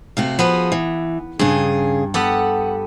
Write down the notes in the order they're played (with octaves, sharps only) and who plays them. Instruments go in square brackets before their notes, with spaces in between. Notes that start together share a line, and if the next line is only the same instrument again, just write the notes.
[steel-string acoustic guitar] C3 A3 F#4 [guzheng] F5
[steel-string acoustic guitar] F3 F#4 G#4 [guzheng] B3 B4
[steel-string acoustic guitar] E3
[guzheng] G2 [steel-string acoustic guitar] C#3 G#4
[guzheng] B3 G4 A4 [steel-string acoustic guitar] F#5